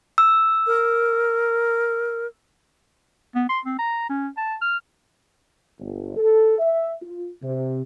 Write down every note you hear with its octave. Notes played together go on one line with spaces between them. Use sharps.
E6
A#4
B3
C6
C4
A#5
C#4
A5
F6
G1
A4
E5
F4
C3